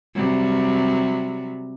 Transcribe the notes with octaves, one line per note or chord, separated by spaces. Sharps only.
C3 F#3 G3